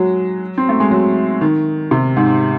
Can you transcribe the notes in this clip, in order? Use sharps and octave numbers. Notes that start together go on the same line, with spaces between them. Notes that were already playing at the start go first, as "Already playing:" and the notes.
Already playing: F#3 G#3
C4
A3
G#3
F#3
D#3
C3
G#2